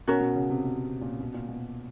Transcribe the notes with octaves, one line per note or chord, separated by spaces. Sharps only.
B2 C#4 F#4 A#4
B2
C#3
C3
B2
A#2
B2
A#2
B2